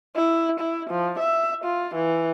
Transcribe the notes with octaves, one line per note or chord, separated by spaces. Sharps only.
E4
E4
F3
E5
F4
E3